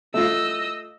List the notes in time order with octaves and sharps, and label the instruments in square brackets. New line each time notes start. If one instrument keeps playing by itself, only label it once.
[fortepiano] A3 F4 [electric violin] D#5 E6